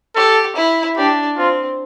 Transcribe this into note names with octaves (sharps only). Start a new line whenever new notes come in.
G4 A4
E4
D4 G4
C4 F4